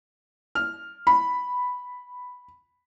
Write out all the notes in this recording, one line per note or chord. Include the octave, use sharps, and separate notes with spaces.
F6
B5